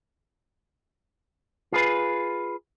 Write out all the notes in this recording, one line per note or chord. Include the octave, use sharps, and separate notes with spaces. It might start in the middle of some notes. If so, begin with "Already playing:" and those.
F4 G#4 B4